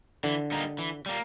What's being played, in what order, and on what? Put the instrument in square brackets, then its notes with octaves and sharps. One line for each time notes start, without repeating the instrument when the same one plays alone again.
[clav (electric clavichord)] D3 [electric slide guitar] E3
[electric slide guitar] G3 A#3 D#4
E3
G3 A#3